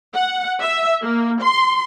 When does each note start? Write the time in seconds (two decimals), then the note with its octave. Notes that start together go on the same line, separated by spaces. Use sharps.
0.15 F#5
0.60 E5
1.02 A#3
1.42 C6